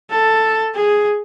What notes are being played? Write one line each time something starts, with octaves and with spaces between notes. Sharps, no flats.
A4
G#4